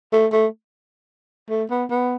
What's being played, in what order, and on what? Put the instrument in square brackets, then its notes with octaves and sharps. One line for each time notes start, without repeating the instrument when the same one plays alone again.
[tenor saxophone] A3
A3
A3
B3
B3